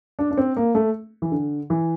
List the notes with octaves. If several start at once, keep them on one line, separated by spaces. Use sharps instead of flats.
D4
D4
C4
A#3
A3
E3
D3
E3